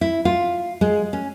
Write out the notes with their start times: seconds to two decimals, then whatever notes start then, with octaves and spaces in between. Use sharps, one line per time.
0.01 E4
0.25 F4
0.81 G#3
1.13 C#4